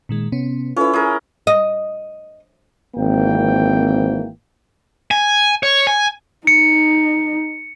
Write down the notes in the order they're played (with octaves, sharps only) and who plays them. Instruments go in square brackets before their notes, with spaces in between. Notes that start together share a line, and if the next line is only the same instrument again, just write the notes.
[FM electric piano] A#2 D#3 G#3
C3 B3 C#4
[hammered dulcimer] C#4 E4 [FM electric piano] F4 A4 B4
[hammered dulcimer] G#4 A#4
[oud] D#5
[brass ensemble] G#1 E3 F3 A#3 C4 G5
[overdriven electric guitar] G#5
C#5
G#5
[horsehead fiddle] D#4 [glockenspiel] C#7